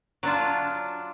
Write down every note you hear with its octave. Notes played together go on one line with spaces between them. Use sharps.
F#3 D4 F4